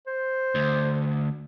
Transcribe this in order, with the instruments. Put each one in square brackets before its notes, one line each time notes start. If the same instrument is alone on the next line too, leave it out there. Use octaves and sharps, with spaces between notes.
[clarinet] C5
[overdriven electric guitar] D2